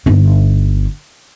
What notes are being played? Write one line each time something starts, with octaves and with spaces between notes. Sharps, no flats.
G1 D#4